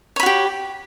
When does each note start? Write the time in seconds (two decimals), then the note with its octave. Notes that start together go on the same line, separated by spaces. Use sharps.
0.16 C#5
0.20 B5
0.23 F#4
0.26 G4